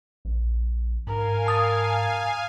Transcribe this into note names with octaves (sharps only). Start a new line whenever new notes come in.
A#1
G#2 A#4 F5 G#5
A5 D#6 A6